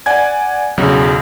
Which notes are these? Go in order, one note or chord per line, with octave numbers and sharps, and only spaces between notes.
D5 F#5 G#5 G#6
B1 E2 C#3 F#3